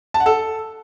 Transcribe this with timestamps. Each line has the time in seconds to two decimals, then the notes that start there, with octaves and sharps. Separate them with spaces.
0.14 A5
0.20 F#5
0.26 A4